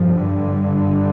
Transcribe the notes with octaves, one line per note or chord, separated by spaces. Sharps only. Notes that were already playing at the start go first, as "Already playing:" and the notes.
Already playing: G2 F3
D3